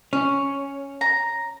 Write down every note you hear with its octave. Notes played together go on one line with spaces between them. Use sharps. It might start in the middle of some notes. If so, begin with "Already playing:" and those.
C#4
A#5